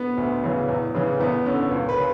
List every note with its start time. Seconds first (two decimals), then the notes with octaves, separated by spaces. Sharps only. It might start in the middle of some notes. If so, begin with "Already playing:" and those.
Already playing: B3
0.17 D2
0.43 C#3 E3
0.69 E2
0.94 C#3 E3
1.20 E2 B3
1.46 D3 C#4
1.71 C#2
1.89 B4
1.97 C#3